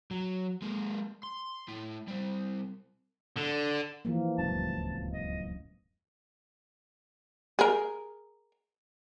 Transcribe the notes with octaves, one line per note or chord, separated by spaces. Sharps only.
F#3
G#3 A#3
C6
A3 E4
C3 G3
D3
E3 F3 A#3
D1 C#2 F#2 A5
D#5
G#4 A#4